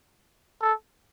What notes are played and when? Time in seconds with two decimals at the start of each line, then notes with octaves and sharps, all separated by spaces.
0.61 A4